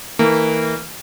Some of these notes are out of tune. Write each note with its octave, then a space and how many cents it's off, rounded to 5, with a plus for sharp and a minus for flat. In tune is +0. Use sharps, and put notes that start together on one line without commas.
E3 -35 A#3 -30